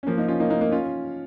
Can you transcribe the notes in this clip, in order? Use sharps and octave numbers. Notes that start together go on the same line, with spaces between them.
C#4
F3 A#3
A#3 D#4
C#4 F4
A#3 D#4
A#3 D#4
A#3 D#4
C#4 F4